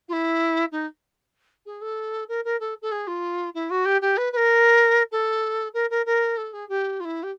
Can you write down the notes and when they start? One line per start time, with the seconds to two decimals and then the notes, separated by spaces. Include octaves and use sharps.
0.09 F4
0.13 E4
0.72 D#4
1.66 G#4
1.82 A4
2.29 A#4
2.45 A#4
2.60 A4
2.82 A4
2.92 G#4
3.07 F4
3.55 E4
3.70 F#4
3.85 G4
4.01 G4
4.17 B4
4.32 B4
4.37 A#4
5.12 A4
5.74 A#4
5.90 A#4
6.06 A#4
6.37 A4
6.53 G#4
6.69 G4
7.00 F4
7.05 E4
7.23 G4